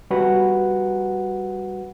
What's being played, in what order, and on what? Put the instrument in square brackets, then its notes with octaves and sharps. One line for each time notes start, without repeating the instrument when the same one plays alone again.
[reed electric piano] G3 F#4 B4 F#5